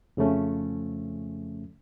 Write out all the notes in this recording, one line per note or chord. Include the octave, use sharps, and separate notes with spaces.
F2 C#3 F3 A3 C#4